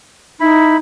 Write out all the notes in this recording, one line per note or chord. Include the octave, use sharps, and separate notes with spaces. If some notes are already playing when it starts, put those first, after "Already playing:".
D#4 E4 B5